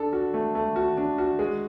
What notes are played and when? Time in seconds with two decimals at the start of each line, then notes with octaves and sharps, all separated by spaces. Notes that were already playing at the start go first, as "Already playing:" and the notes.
Already playing: D4 A4
0.13 F#4
0.34 A3
0.55 A3
0.76 F#4
0.97 D4
1.18 F#4
1.39 G#3